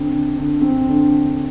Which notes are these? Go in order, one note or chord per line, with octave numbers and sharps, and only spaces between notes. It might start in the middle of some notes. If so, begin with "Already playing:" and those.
Already playing: D3 C4
D3
D3
C4
D3